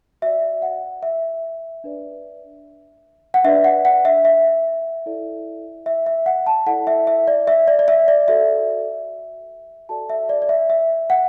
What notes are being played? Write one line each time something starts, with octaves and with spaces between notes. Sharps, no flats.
F#4 D5 E5
F#5
E5
D4 B4 D5
F#5
D4 B4 D5 E5
F#5
F#5
E5
E5
E4 A4 D5
E5
E5
F#5
A5
E4 A4 D5 F#5
E5
E5
D5
E5
D5
D5
E5
D5
F#4 A4 D5 E5
F#4 A4 D5 A5
E5
D5
D5
E5
E5
F#5